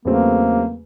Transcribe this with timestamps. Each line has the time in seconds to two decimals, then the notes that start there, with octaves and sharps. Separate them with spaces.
0.05 E2 C#3 F#3 A3 A#3 C4